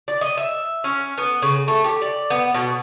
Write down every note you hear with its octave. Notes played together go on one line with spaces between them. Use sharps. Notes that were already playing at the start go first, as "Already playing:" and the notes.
D5
D#5
E5
C#4
B3
C#3
A3
G4
D5
B3
B2